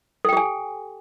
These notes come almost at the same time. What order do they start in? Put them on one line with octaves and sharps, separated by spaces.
A4 G5 G4 G#5